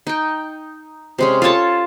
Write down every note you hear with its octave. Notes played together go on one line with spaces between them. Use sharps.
D#4 G5
C3 G#3 C#4
F4 A4 C#5 A5